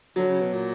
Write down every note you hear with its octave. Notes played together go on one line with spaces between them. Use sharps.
D3 F#3
C#3
B2
A#2